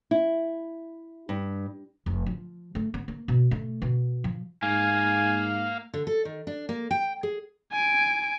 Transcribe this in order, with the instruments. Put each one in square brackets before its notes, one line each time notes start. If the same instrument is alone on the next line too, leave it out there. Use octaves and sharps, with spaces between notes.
[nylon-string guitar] E4
G2
[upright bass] F1
F3
A3
B3
A#3
B2
A3
B2
F3
[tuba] G#2 [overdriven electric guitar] A#3 [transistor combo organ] F5 [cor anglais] G#5
[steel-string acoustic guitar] D3
A4
D#3
D4
A#3
G5
G#4
[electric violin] G#5 D7